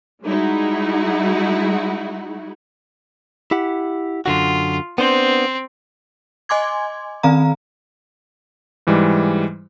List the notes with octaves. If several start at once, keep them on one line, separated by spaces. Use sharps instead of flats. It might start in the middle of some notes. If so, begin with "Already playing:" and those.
G3 G#3 D#4 E4 F#4
E4 G4 F#5
F#2 D3 F4 F#4
B3 C4 D4 C5
D#5 G#5 C6 D6 G#6
D#3 C4 F5 A#5
G#2 E3 G3 G#3